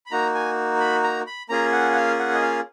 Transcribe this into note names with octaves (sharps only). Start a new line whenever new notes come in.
B5
A#3 D#4 F#4 A#5
G#5
B5
A#5
B5
A#3 C#4 F4 G#4 A#5
F#5
F#5
F5
F#5
D#5
F5